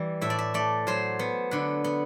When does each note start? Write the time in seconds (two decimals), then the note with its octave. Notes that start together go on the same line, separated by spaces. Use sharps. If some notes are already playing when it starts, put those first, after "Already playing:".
Already playing: E3 G3
0.21 A2 E5
0.30 D5
0.39 E5
0.54 A3 D5
0.87 F#3 C5
1.19 B3
1.51 D3 B4
1.84 B3